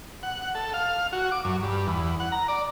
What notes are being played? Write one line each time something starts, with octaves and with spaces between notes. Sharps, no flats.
F#5
A4
F5
F#4
D6
F#2
G2
E2
F#5
A#5
D5